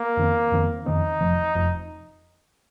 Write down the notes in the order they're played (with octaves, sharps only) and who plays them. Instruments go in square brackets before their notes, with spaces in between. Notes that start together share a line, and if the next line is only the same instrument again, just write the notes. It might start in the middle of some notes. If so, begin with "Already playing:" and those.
Already playing: [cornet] A#3
[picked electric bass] F2 D#3 C4
F2 D#3 C4
[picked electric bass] F2 D#3 C4 [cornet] D#4
[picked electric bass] F1 F2 F3
F1 F2 F3